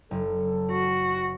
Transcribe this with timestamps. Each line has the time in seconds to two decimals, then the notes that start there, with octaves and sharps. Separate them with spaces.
0.11 F#1 A4
0.71 F#4